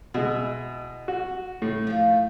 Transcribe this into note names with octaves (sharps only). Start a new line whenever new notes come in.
B2 G#3 E4
F#4
A2
F3 A3